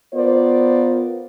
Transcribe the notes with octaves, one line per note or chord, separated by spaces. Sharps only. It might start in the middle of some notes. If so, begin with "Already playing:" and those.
B3 F4 A#4 C5 D5